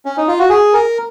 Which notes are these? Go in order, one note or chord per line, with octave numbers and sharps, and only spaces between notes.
C#4
D#4
F4
F#4
G#4
A#4